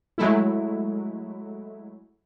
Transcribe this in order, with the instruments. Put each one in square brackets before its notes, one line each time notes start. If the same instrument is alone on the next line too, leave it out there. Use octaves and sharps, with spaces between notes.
[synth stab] F#3 G#3 A3 E4